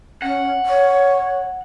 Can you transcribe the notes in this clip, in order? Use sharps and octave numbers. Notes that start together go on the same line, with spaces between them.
C#4 F#5
C#5